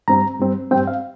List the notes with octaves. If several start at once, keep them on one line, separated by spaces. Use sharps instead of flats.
G2 G3 C4 A#5
G2 G3 C4
G2 G3 C4 G5
F5